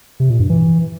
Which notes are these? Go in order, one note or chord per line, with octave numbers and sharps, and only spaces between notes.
C3
A#2
G2
E3